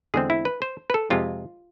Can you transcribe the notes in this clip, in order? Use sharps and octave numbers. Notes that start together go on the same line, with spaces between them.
E2 D3 G#3 C4 G#4
E4
B4
C5
B4
A4
F2 C3 G#3 F4